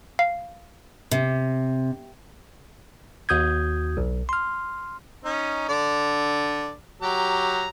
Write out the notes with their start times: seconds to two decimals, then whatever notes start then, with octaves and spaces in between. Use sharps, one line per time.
0.19 F5
1.11 C3
3.29 D#2 F#4 D#6 G6 G#6
3.97 B1
4.29 C6 F6
5.25 C#4 D#4
5.69 D3 D5
7.02 F#3 G4 A#5